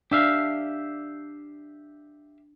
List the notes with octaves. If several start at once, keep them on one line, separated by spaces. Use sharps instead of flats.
D4 G4 E5 F5